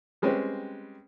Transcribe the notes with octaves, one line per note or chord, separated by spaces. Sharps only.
G3 G#3 C4 C#4 B4